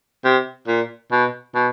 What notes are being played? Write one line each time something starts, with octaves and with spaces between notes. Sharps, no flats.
C3
A#2
B2
B2